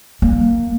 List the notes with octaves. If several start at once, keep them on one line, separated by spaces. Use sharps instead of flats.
A#3